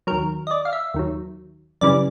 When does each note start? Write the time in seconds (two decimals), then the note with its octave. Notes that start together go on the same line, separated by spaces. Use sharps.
0.07 D#2 D#3 F#3 A#4
0.47 D#5
0.51 D5
0.65 F5
0.73 E5
0.94 D#2 D#3 F#3
1.81 F#2 C#3 E3 G3 D5